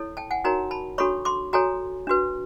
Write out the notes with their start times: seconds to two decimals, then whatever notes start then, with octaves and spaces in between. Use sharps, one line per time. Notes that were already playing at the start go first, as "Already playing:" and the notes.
Already playing: E4 A4 C#5
0.17 G5 A5
0.31 F#5 G#5
0.44 D#4 F#4 A#4 C#5 G#5 A#5
0.71 A5 B5
0.98 D4 F#4 A4 C#5 B5 C#6
1.25 C6 D6
1.53 F#4 A4 C#5 G#5 A#5
2.07 D4 F#4 B4